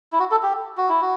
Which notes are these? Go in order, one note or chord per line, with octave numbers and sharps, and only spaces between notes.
E4
F#4
A4
G4
F#4
E4
F#4